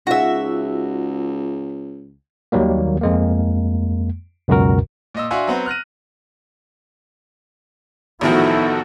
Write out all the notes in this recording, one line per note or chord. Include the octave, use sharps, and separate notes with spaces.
C#2 D#4 F4 F#4 G#4 E5
D#2 D#3 F#3 G3 A#3
F2 G#3 A#3
C#2 F#2 B2 F#4 A#4
A#2 D#5 E6
D4 F#4 E5 F5 G#5 C6
F#3 B3 C4
F6 F#6 A#6 D#7
A1 D#3 F3 B3 D#4 E4 F#4 A4